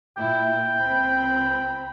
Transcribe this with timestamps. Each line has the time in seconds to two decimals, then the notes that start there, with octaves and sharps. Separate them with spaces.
0.17 A#2 E4 G5
0.76 C#2 C4 B5